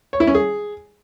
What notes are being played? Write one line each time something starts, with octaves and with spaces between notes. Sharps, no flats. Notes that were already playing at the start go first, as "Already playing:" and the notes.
C#5
E4
C#4
G#4